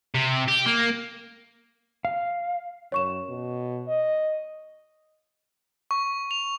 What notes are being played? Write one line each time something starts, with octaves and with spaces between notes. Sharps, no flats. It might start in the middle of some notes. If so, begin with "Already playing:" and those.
C3
G4
A#3
F5
F#2 C#5 C#6 E7
B2
D#5
C#6
F7